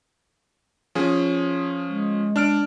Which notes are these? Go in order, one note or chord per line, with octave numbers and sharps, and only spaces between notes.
F3 C#4 G#4
G#3
D4 F6 D7